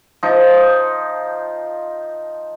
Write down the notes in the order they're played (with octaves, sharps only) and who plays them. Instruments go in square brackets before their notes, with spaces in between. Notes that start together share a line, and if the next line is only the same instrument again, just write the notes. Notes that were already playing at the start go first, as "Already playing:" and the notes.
[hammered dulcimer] F3 D#4